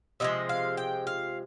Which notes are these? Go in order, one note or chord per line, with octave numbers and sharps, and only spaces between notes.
C3 F3 G#3 D#5
F5
G5
F5